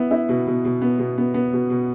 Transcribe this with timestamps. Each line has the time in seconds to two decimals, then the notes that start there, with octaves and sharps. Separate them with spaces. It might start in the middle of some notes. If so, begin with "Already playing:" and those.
Already playing: B3 E4
0.11 E4
0.29 B2
0.47 B2
0.65 B2
0.82 B3
0.99 B2
1.18 B3
1.34 B3
1.53 B2
1.70 B2